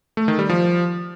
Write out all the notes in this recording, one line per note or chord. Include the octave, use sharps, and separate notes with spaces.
A3
D#3
G3
F3